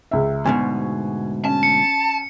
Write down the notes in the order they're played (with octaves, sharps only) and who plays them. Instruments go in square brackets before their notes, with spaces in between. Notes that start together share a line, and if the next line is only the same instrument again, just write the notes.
[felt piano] C#2 E5
[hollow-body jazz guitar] D2 G#2 B2 [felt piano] G#5
[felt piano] C#4 [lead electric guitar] A5
[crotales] C#7